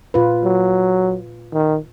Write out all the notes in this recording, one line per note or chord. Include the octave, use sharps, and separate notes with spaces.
A#2 F4 B4
F#3
D#3